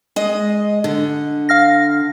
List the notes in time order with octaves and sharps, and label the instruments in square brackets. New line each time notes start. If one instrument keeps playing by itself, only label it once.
[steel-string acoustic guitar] G#3 D#5
D3
[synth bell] F5 F6 A#6